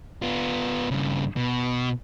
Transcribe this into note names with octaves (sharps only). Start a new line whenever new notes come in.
B3 F4
G2 C#3
B2